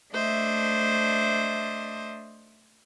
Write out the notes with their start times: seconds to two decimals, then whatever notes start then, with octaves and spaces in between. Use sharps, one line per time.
0.11 A3 D4 C5 D#5 E5